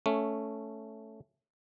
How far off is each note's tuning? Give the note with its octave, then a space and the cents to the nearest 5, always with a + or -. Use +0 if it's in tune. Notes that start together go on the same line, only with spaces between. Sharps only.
A3 +0 C#4 +5